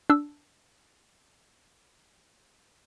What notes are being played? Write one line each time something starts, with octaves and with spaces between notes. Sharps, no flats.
D4 E6